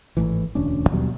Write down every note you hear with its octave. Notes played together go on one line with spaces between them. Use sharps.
G#1 C#2 A2 E3
E1 D2 C#4 D4
D#2 B2 F#3 G3